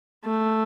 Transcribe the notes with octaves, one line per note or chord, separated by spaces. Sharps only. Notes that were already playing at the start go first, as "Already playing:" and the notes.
A3